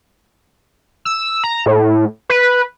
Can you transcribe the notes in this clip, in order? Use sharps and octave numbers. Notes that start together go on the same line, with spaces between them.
E6
A#5
A2
B4